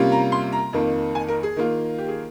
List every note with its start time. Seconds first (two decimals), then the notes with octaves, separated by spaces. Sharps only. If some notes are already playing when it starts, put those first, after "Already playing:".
Already playing: C3 G3 A#3 C#4 F4
0.12 A#5
0.32 C6
0.52 A#5
0.73 F2 D#3 A#3
1.15 G#5
1.28 A#4
1.43 G#4
1.56 D#3 A#3 F4
1.98 G4
2.09 G#4